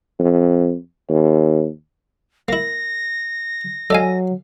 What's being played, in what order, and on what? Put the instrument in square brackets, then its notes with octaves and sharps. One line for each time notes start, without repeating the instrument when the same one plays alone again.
[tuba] F2
D#2
[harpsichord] A#3 E4 [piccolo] A#6
[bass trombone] F#3 [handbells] A4 D#5 G#5 [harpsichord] D5 F5